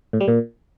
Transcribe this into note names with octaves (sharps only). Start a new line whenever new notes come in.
A2
G3
A#2